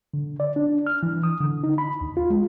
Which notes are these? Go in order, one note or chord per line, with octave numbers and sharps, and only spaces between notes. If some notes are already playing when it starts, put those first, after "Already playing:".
D3
D5
D4
F6
E3
D#6
D3
D#4
B5
D#2
F4
G#3